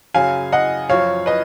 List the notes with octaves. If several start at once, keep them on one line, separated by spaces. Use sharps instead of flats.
F#2 C#3 F#3 F5 G#5
D#5 F#5
F#2 F3 C#5 F5
B4 D#5